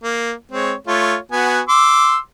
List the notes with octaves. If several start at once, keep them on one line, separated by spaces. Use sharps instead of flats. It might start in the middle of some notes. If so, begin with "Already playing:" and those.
A#3
G#3 C4 C#5
A3 F4 C#5
B3 F#4 G#5
C6 D6 E6